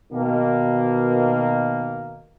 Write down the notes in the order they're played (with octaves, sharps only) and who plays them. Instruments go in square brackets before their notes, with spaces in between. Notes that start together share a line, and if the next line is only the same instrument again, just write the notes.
[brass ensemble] B2 D#3 A#3